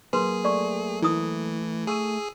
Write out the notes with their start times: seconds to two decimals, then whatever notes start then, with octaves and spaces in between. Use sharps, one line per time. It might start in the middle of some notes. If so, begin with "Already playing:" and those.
0.13 F#3 A#3 G#4 B4 C6
0.45 A3 D5 C#6
1.02 E3 E4 D#6
1.87 G#4 C#6 E6 D#7